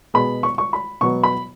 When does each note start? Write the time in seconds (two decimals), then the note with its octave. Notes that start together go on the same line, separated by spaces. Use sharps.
0.14 B2 G#3 B3 B5
0.43 C#6
0.58 C#6
0.73 B5
1.01 B2 F#3 B3 C#6
1.23 B5